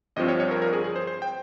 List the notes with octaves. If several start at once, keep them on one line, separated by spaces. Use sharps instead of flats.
G1 G2 F3 C4 D#5
C#5
C#5
A#4
A#4
G#4
G#4
C5
C5
G5